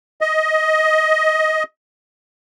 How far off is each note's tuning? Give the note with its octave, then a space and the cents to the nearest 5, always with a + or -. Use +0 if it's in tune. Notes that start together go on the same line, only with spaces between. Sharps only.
D#5 +15